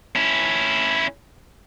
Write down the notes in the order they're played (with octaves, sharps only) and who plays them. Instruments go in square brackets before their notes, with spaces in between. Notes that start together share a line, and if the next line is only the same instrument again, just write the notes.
[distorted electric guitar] C#4 E4